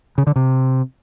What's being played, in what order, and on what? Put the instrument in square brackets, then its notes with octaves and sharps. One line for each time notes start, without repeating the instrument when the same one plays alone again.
[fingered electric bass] C#3
D3
C3